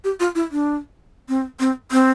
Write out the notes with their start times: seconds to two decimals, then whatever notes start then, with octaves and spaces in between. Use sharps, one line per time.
0.04 G4
0.20 F4
0.35 E4
0.51 D4
1.29 C4
1.60 C4
1.92 C4